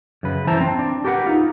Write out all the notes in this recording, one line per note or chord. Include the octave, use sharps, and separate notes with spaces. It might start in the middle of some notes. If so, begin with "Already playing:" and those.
F#2 C#3 B4
E3 E4 C5 A5 A#5
C4
D4
G4 A#4 B4 F#5
D#4 F4